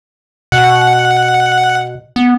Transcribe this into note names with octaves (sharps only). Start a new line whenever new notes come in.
B2 F#5
B3